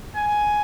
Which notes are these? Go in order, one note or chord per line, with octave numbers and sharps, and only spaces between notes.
G#5